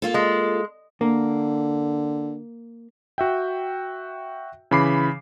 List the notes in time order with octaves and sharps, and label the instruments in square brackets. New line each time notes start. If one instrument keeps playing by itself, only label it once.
[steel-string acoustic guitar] A#3 F4 A4
[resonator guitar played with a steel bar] G#3
[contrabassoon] D3 [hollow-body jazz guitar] A#3
[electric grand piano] F#4 E5 G5
C#3 E3 B5 D6 C7